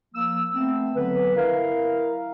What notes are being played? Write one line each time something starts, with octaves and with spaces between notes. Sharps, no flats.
F3 A#3 E6
A3 B3 C4
D3 F#3 B4
E4 A#4 F5